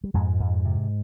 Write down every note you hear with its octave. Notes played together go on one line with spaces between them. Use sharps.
G3
F2 G#2 G#3
F2
C3